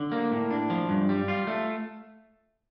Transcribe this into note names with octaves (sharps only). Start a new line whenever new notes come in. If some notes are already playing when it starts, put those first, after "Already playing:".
Already playing: D3
A#3
A2
D4
F3
G2
G3
F4
A3